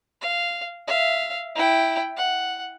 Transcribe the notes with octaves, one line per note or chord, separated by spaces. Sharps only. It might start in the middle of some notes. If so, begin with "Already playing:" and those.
F5
E5 F5
E4 G5
F#5